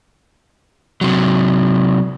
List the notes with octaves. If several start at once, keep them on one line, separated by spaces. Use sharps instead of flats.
C3 F#3